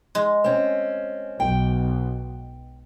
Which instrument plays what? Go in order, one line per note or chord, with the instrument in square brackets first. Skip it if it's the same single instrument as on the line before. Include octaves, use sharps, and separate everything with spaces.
[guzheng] G#3
[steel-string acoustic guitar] C4 C#4
[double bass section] B1 [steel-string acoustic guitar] G5